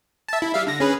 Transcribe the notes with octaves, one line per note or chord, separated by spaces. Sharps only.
E5 A5
E4
G3 E5 F5
D3 A#6
C#4 G#4 B4